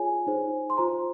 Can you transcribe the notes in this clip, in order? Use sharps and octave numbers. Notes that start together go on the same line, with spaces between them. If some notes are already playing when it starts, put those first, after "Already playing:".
Already playing: F4 G#4 C#5 G#5
D#4 G#4 C5
C6
F4 C5 A#5